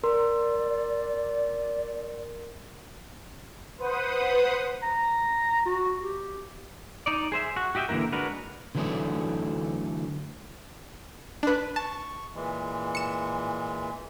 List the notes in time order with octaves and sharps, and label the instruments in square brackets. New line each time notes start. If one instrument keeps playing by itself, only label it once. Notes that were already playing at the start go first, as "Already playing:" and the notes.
[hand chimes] A#4 C6 [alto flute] D5
[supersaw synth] B4 C5 F#5 D#6
[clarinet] A#5
F#4
G4
[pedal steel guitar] D#4 D5
G#4 C5 E5
F#4
F#4 G4 D#5 E5 G5
D3 E3 A#3 E4 A#4
G#3 D4 F#4 A#4 B4
[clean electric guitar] D3 E3 F#3 A3 D4 G#4
[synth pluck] D4 B4
[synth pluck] A5 [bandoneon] C#6
[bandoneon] A#2 E3 G#3
[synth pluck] C#7 E7